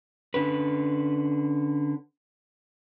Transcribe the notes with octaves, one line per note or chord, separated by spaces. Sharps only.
D3 C#4 B4